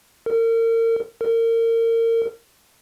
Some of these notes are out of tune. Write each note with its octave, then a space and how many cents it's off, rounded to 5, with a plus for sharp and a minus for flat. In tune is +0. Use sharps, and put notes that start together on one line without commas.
A#4 -35
A#4 -30